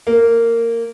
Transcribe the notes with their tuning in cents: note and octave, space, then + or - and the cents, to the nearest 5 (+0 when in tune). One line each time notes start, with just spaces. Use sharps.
A#3 -15